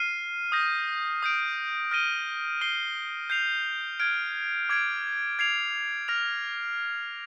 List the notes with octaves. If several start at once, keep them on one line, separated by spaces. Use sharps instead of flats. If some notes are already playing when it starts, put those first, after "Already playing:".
Already playing: F6 C7 D#7
D#6 G6 A#6
D#6 G6 D7
F6 A#6 D#7 G7
F6 C7 D#7 G7
G6 C7 F7
F6 G#6 D7
D6 G#6 D7
G#6 C7 F7
F6 A#6 F7